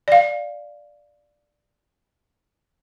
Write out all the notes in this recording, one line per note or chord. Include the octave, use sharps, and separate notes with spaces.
D5 F5